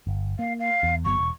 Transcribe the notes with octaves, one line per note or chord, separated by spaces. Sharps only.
G1
A#3 F5
F5
E2
G1 F#3 B3 C#6
E1